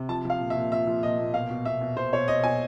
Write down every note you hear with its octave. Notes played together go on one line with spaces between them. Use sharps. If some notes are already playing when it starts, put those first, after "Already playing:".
Already playing: C3
F3 A5
F3 F5
A#2
E5
A#2
F3 E5
F3
A#2 D#5
A#2
B2 F5
B2
B2 E5
B2
B2 C5
B2 C#5
B2 D#5
B2 G#5